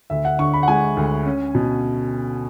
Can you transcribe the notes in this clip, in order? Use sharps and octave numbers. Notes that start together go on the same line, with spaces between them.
D2 E5
F#5
D3 C#6
B5
F#5
G#3 G#5
D2
C#4
B2